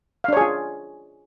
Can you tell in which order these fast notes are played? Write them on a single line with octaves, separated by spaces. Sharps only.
F5 D4 C#5 G#4 F4